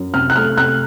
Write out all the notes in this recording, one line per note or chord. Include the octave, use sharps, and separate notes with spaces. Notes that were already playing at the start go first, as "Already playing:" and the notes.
Already playing: F#2
C3 F6
F#6
A3 F6
C3 F#6